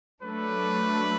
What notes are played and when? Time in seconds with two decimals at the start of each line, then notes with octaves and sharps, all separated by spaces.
0.23 F#3 A3 D4 B4